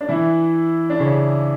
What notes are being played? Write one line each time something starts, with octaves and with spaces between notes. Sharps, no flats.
D4
E3 E4
D4
C#3 C#4